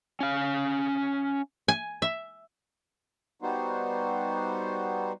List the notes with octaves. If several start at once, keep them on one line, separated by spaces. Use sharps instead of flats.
C#4 F5
G#5
E5
G3 B3 D#4 F#4 C5